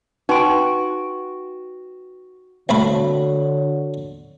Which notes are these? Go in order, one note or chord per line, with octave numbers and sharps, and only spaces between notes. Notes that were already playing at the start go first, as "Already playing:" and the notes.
D#4 F#4 B4 G5 C6 D7
C2 D3 A3 F#4 C#5 B5